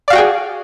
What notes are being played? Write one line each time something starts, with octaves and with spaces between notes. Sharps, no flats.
F#4 G#4 D5 F5 G5